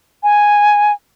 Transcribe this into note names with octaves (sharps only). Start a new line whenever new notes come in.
G#5